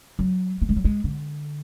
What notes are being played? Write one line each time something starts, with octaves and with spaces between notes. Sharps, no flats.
F#3
A#3
G#3
F#3
G#3
D3